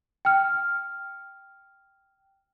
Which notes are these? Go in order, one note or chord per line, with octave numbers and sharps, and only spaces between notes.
G5 F6